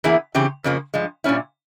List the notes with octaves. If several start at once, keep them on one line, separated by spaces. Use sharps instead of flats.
E2 E3 A#3 E4 G#4
C#3 E3 C4 G4
F2 C#3 F3 A#3
G2 F3 G#3
A#2 G3 C#4 E4